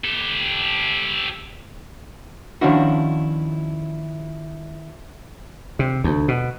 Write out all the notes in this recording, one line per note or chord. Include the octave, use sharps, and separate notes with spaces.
G4 A4
D#3 F3 C#4 D4 E4 F#4
C3
D2
B2